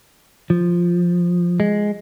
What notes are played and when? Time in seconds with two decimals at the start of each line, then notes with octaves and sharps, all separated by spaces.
0.50 F3
1.60 G#3